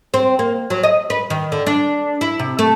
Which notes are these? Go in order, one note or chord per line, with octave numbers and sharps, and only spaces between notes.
C4
A#3
F#3
D#5
B4
D#3
D3
D4
E4
C3
A3